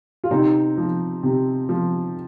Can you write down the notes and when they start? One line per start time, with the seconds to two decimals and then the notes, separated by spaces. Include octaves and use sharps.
0.24 F4
0.31 C3 C4 D#4
0.78 F3
1.23 C3
1.69 F3